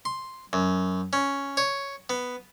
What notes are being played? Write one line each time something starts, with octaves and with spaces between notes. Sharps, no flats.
C6
F#2
C#4
C#5
B3